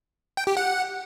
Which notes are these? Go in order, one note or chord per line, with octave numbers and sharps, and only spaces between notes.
G5
G4
F#5